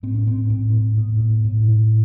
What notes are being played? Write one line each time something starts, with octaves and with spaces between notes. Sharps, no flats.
A2 C4
C#4
A2 C4
A2 C4
A2
A2 B3
A2
A2
A2